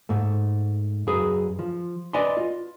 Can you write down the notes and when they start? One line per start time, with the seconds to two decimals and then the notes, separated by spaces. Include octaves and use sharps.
0.09 G#2 A3
1.07 F#2 G#4 B4
1.59 F3
2.13 B4 D5 D#5 G#5 B5 C6
2.37 F4